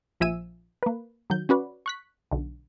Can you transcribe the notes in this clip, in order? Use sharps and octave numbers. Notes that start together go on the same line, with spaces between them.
A#1 F3 E5 G#5 E6 D#7
A#3 B4
D#3 F#3 G6
C#4 F#4 B4 D5
C#6 F#6 B6
B1 D3